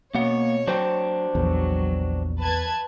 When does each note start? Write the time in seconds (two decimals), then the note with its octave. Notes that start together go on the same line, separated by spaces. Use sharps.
0.15 B2 A#3 C#5 F#5
0.68 F#3 D4 C5 G5
1.35 A#1 E2 F#3
2.39 B4 A5 G#6